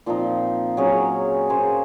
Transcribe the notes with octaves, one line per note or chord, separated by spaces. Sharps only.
A#2 F3 C4 D#4
F#3 C#4 G#4 C#5
A#3 C#4 G#4 C5